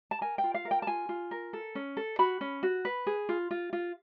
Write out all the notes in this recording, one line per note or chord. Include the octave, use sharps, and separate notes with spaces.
A5
A#4 G#5
G5
F4
F5
A#4
G5
A5
F4 G#5
F4
A#4
A4
C#4
A4
F#4 B5
C#4
F#4
B4
G#4
F4
F4
F4